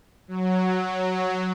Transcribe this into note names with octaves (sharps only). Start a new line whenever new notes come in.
F#3